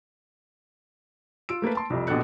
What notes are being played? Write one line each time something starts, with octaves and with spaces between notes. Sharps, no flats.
F4 E6 D7
A3 A#3 A4 B4
A5 C6
C2 F2
A#1 B2 D4 A4 F#6 C#7